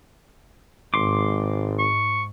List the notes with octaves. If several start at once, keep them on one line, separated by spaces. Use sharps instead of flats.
G#1 G#2 C6 D6
C#6